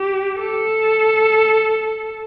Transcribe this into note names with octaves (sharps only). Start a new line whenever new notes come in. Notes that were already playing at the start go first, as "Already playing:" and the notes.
Already playing: G4
A4